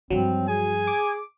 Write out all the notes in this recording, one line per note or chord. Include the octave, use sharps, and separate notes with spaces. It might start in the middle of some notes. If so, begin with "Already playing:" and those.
G2 F3 F#3 C4
G#4 G#5
D6